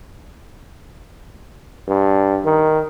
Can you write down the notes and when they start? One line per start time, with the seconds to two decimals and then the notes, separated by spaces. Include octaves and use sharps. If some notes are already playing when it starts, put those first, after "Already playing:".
1.88 G2
2.45 D#3